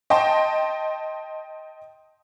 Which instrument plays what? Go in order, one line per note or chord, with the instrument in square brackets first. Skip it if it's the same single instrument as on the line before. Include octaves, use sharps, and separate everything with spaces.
[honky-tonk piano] D#5 G5 A5 C6